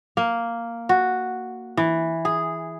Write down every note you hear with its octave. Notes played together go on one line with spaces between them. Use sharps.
A#3
F#4
E3
G#4